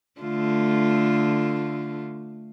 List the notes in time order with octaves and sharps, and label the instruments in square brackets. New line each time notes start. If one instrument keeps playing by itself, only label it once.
[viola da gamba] D3 A3 F4